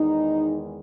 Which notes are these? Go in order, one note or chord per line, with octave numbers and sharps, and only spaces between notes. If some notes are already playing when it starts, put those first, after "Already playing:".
Already playing: E2 D#3 G#3 D#4